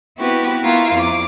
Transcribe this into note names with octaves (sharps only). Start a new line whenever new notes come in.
B3 C4 E4 F#4 G4 B4
B3 E4 F4 A#4
F2 D6